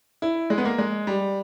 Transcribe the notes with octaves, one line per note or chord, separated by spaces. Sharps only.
E4
G#3
B3
A#3
G#3
G3